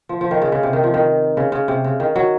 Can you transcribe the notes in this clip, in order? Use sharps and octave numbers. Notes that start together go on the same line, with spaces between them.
F3
F3
D#3
C#3
C#3
C3
D#3
F3
D#3
C#3
C#3
C3
C#3
D#3
F#3